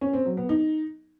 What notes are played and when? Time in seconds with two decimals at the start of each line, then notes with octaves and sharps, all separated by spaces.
0.01 C#4
0.13 C4
0.25 F#3
0.37 B3
0.49 D#4